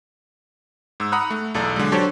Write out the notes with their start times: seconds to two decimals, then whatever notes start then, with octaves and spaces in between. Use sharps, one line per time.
1.00 G#2 E6
1.12 F#5 A#5 B5 D#6 F#6
1.30 A3
1.54 B1 E2 A4 D5 A#5
1.76 D3 F#3 G#3
1.92 F#3 D4 G4 A4 C5 C#5